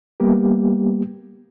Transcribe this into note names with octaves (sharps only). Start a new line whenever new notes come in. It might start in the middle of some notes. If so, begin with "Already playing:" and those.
G3 A#3 B3 G4